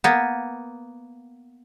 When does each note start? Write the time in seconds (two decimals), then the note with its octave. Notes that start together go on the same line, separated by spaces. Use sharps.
0.04 A#3 B3